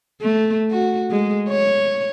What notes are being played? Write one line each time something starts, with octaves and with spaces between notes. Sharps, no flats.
A3
F#4
G#3
C#5